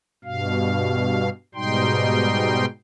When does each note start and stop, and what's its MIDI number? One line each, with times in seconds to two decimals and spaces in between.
0.24 1.29 43
0.24 1.29 47
0.24 1.29 77
1.55 2.65 44
1.55 2.65 47
1.55 2.65 55
1.55 2.65 63
1.55 2.65 79
1.55 2.65 84